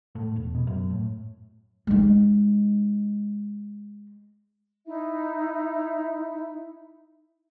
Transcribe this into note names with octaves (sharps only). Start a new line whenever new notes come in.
A2
E1
B2
F#2
A2
G#3 D#4
D#4 E4 E5